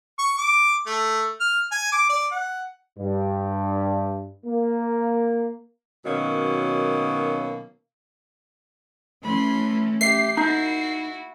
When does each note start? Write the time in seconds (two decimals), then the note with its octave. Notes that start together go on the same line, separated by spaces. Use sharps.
0.19 C#6
0.38 D6
0.87 A3
1.40 F6
1.72 G#5
1.92 D6
2.09 D5
2.31 F#5
2.99 G2
4.46 A#3
6.05 B2 D#3 F#3 A#3 C#4
9.23 E3 A3 C#4 B5 C6
10.01 G4 E5 C7
10.37 A#3 D#4 E4 F#4